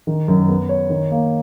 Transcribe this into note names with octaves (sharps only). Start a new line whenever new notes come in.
D#3
F#2
B3
C#5
D#3
A#3